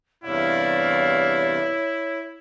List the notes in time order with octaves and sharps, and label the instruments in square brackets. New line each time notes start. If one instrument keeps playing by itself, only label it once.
[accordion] E2 G2 C3 [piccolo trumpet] E4 [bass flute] C#5 [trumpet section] D5 F5